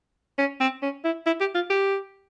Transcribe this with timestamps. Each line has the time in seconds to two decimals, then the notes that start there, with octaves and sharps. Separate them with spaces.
0.38 C#4
0.60 C4
0.82 C#4
1.04 E4
1.26 E4
1.40 G4
1.55 F4
1.70 G4